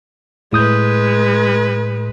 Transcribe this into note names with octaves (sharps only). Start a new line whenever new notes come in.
A2 G#3 B4 D#6 G6